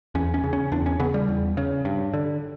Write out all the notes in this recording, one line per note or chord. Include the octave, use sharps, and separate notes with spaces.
E2 C#4
C#4
C#3
C#4
E2 D4
C#4
C#3 B3
G3
E2
C#3
G2
D3